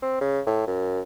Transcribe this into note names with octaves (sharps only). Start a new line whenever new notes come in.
C4
C#3
A2
F#2